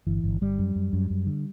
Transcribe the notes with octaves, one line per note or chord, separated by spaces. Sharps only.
G1 E3
G1
G1 G3
F#2
F#2
F#2
F#2
D3